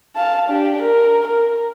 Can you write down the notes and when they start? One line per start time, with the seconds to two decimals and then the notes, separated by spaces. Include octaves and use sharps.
0.16 F5 A5
0.48 D4 G4
0.81 A#4
1.27 A#4